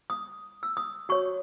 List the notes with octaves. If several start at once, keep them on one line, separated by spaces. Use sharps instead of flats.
D#6
E6
D#6
F#4 C#5 C#6